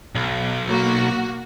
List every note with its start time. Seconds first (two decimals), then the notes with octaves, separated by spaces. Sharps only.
0.15 B1
0.69 A#3 F#4